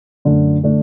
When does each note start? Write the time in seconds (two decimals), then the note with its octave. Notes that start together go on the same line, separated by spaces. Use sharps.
0.25 F#2 D3 A3 D4
0.63 D3 A3 D4